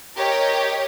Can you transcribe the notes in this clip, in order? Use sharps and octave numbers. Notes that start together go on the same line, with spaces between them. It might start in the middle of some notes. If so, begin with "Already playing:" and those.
G4 A#4 C#5 D#5